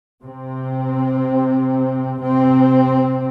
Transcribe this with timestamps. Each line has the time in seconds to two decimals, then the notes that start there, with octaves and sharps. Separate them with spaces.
0.23 C3 C4
2.21 C3 C4